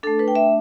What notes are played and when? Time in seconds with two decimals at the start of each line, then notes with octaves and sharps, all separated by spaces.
0.03 A3 D4 A4
0.19 B4
0.28 G5
0.35 E5